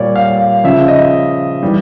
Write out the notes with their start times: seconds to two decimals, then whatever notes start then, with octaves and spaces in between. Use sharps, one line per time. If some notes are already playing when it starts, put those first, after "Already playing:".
Already playing: A#2 G3 C#5 D5
0.16 F5
0.64 C#3 F3 E5
0.88 D#5
1.63 E3 G3